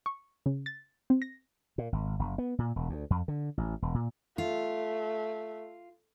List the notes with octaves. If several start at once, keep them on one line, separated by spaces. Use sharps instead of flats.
C#6
C#3
A6
C4
A#6
A#2
G#1
F#1
B3
A#2
E1
D2
F2
D3
A1
E1
A#2
A3 F4